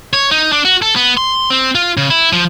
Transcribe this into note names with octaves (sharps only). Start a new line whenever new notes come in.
C#5
D#4
D4
F#4
A4
B3
C6
C4
F4
C#3
E4
F3